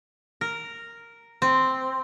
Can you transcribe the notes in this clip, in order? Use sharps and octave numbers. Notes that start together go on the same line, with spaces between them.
A#4
C4